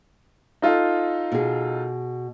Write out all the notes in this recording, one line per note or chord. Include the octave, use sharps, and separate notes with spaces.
D#4 F4 A4
B2 G#4